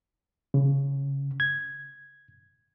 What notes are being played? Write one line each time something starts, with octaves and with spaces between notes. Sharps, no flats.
C#3
G#6